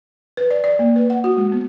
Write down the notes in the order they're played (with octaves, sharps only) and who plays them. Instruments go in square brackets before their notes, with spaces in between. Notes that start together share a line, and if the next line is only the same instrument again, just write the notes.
[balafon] B4
D5
D5
A#3
B4
F#5
F#4
G#3
B3